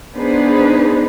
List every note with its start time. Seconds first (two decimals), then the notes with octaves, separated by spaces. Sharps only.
0.15 B3 D4 D#4 G#4 B4 C5